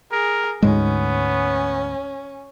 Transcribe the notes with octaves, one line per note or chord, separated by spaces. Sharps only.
G#4 A#4
D2 G#2 G#3 B3 C#4